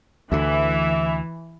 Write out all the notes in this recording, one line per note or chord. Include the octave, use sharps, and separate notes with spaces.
D2 D3 E3 E5